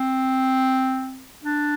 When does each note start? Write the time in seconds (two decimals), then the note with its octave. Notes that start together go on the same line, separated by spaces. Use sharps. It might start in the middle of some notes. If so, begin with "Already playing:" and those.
Already playing: C4
1.44 D4